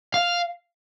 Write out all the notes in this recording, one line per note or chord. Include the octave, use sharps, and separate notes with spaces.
F5